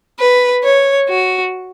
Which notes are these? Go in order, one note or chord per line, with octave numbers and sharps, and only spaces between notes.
B4
C#5
F#4